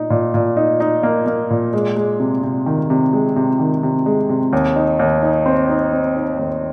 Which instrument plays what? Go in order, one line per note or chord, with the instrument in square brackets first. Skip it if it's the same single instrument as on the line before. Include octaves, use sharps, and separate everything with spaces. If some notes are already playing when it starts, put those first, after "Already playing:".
Already playing: [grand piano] A#2 D#4
A#2
A#2
D#4
D#4
A#3
A#3
A#2
G#3
G#3
C3
C3
D#3
C3
G#3
C3
D#3
C3
G#3
C3
D#2
D#4
D#2
D#4
C4
D#4
C4
D#4
D#2